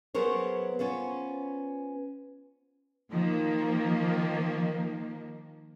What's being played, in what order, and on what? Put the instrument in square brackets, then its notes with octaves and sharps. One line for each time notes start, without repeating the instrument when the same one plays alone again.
[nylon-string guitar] F#3 B3 G#4 A#4 C5 C#5
B3 C#4 F4 C5
[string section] D#3 F3 A#3